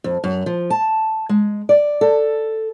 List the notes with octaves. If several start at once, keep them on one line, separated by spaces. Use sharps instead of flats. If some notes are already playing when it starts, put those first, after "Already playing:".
F2
F#2
F3
A5
G#3
D5
A4